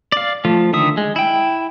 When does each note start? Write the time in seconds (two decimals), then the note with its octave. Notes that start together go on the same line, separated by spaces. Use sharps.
0.12 D5 F5
0.45 F3 A3 F4
0.73 D3 D#3 E5 D#6
0.97 G#3
1.16 E4 G5